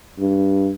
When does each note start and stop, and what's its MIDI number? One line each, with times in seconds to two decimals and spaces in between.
0.19 0.72 43